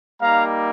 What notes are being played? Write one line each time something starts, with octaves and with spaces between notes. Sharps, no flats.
G3 A#3 D#4 F5 A#5